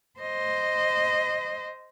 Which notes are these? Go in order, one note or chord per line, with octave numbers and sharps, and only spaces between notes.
C5 D#5